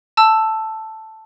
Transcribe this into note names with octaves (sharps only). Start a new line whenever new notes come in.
A5 E6